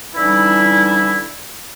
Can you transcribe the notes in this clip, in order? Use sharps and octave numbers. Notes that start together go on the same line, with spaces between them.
D3 E3 G3 C#4 D#4 E4